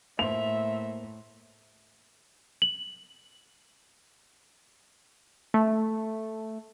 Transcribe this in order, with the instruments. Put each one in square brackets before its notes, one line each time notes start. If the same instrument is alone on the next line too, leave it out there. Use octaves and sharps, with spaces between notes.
[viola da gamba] A2 [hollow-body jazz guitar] A#3 C5 [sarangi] E5 [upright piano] F7
[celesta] F#7
[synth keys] A3